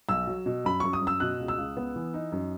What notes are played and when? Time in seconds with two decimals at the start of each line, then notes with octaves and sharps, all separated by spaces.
0.09 B1 E6
0.27 F#3
0.46 B2
0.65 F#2 B5
0.80 F#2 C#6
0.93 D#6
1.01 F#2
1.07 E6
1.20 B2 F#6
1.40 C#2
1.48 E6
1.58 C#2
1.77 B3
1.96 E3
2.14 D#4
2.32 F#2